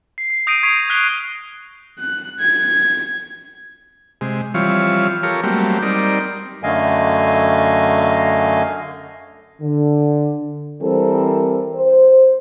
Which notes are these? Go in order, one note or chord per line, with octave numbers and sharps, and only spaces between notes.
C7
C7
D#6 G6 A#6 C7 D7 D#7
C#6 G#6 B6 C7 D7 F7
F6 F#6 B6 C7 G7
F#6
G#6
C3 G#3
E3 F3 G3 C4 F4 C#5
F4 G4 A4 A#4 C#5
F#3 G3 A3 A#3 C4 G4
G3 C4 D#4 A#4 D5
F#2 D3 A3 D#5 F5 G#5
D3
E3 G3 C4 A4 A#4 C5
C5